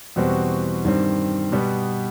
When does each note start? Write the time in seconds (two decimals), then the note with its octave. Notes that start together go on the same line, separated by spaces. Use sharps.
0.16 E2 B2 G3 C4 F#4
0.84 G2 D#3 G3 C4
1.52 B2 G3 B3